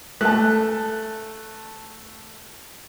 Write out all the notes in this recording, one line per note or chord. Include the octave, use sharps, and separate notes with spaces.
A3 A5 F#6